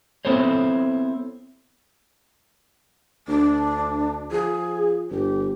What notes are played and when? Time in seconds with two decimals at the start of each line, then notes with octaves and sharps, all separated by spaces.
0.25 B3 C4 E4 A4 C5 C#5
3.28 D2 D4
4.31 F3 G#4
5.11 G1 G4